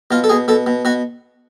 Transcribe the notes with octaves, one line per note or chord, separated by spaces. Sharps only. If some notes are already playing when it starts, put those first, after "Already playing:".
B2 F4
A4
B2 G#4
B2 A4
B2
B2 F#4